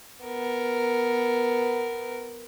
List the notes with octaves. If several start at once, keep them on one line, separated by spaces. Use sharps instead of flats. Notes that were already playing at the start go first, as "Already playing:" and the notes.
B3 A#4